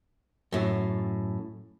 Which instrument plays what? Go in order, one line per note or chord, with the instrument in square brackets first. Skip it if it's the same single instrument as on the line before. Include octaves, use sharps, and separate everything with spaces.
[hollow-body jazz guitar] F#2 A2